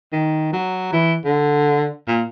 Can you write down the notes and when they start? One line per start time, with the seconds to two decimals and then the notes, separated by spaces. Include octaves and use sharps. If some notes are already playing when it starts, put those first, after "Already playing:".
0.13 D#3
0.53 F#3
0.92 E3
1.24 D3
2.08 A#2